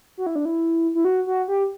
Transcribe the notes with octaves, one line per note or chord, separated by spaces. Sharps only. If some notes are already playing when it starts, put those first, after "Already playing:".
F#4
E4
D4
E4
E4
F#4
F#4
G4